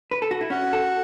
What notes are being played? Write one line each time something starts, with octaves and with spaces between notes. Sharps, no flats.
B4
A4
F#4
E4
C#4 F#4
A4